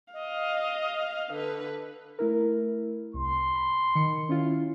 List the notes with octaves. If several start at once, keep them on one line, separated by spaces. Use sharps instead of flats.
D#5 F5
D3 B4
A3 E4 A#4
C2 C6
B5
D#3 C#7
C#4 E4 F4